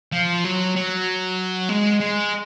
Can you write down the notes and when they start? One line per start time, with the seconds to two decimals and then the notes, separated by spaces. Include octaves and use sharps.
0.12 F3
0.44 F#3
0.76 F#3
1.69 G#3
2.00 G#3